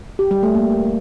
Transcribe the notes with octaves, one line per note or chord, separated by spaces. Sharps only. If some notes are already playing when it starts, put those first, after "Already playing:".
G4
G3
A3
A#3